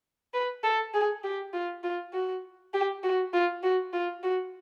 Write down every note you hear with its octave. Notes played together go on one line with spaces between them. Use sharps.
B4
A4
G#4
G4
F4
F4
F#4
G4
F#4
F4
F#4
F4
F#4